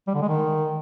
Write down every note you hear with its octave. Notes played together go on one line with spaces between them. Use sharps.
G3
D3
G#3
D#3